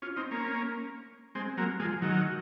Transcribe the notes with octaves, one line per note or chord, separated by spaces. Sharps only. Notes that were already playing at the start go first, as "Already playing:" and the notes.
C#4 F4
C4 D#4
A#3 C#4
G#3 C4
F#3 A#3
F3 G#3
D#3 F#3